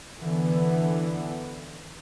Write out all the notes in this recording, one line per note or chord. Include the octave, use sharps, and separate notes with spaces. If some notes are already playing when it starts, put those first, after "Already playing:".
D3 E3 B3